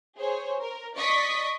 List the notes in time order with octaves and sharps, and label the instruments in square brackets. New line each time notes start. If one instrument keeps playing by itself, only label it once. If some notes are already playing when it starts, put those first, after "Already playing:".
[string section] G#4 C5 C#5
A#4
D5 D#5 C#6 D#6 B6